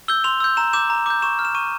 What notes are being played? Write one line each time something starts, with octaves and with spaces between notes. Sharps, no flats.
E6 G6 G7
C6 F7
E6 G6
A#5 E7
D6 G6 E7
A#5
D6 G6
C#6 E7
F6
E7
C#6 D#7